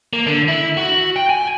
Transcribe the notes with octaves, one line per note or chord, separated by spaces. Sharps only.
A#3
D3
E4
F#4
G5
G#5